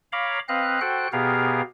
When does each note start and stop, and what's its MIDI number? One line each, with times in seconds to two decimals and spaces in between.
0.12 0.39 73
0.12 0.39 77
0.12 0.39 82
0.12 0.39 83
0.12 0.39 86
0.49 0.80 60
0.49 0.80 71
0.49 0.80 75
0.49 0.80 77
0.49 0.80 90
0.81 1.08 66
0.81 1.08 69
0.81 1.08 72
0.81 1.08 78
0.81 1.08 79
0.81 1.08 90
1.13 1.62 47
1.13 1.62 59
1.13 1.62 67
1.13 1.62 68
1.13 1.62 70
1.13 1.62 77